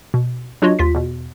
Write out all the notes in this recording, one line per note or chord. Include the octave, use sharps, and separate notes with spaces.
B2
F#3 D4 F4 F#4 C#5 D#5
D#2 F4 B6
E2 B2